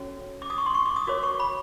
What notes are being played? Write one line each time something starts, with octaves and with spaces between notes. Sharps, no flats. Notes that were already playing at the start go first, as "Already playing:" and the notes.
Already playing: C#4 F#4 A4 C#5
D6
D#6
C#6
C6
C#6
D6
D#6
F#4 A#4 C#5 D6
C#6
B5